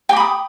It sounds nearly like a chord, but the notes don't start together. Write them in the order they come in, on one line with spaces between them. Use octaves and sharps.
G5 D6 B5 D#6